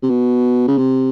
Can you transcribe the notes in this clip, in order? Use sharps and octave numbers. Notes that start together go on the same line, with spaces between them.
C3
B2
C#3
C3